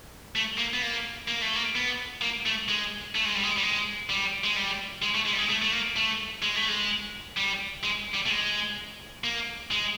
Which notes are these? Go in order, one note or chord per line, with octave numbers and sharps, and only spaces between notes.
A3
A#3
B3
A#3
A#3
A3
A#3
B3
A#3
A3
G#3
A3
G#3
G3
G#3
G3
G#3
G3
G#3
G3
G#3
A3
G#3
G3
G#3
A3
A3
A#3
A3
G#3
A3
G#3
G3
G#3
G3
A3
G#3
A#3
G#3